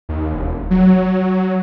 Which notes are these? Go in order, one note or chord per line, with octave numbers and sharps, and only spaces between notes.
D#2
E1
F#3